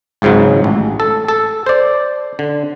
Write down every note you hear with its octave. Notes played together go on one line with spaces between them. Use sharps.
G#1 C#2 G#2 C#3 F#3
A1
A4
A4
C5 D5
D3